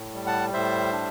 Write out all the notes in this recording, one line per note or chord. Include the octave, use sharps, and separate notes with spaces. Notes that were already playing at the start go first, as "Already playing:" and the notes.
Already playing: A2
G3
F#5 A5
A2 C5 E5
D4